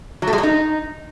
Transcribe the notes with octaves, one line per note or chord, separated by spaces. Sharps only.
F#3
A3
G#3
F#3
D#4